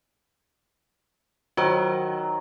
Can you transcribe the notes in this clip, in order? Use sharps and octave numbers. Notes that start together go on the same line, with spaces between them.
D#3 F#3 F#4 C5